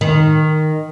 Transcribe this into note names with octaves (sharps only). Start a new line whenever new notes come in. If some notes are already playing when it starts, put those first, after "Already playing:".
D#3